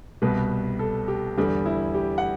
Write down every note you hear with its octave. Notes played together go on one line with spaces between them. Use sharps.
C2 B2 G3 B4
A4
G4
E2 D3 G3
E4
G4
F#5